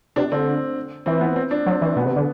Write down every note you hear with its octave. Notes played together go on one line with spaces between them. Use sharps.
C3 D4
D3 C4
E3 C4
B3
C4
D4
F#3 C4
E3 C4
B2 B3
C3
D3